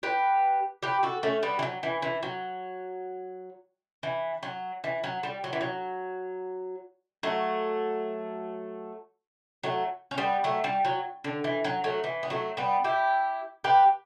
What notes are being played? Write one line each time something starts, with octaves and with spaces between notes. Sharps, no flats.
G4 B4
G4 B4
F#4 A4
A3 C#4
G3 B3
E3
F#3
E3
E3
F#3
E3
F#3
E3
F#3
G3
F#3
E3
F#3
F#3 A3
F#3 A3
C#4
G3 B3
F#3 A3
G3
F#3
D3
E3
F#3
F#3 A3
E3
B3
F#3 A3
G3 B3
E4 G4
G4 B4